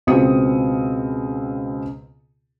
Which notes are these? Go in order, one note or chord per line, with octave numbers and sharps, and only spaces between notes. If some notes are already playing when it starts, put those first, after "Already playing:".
C#2 B2 C4 D#6 C#7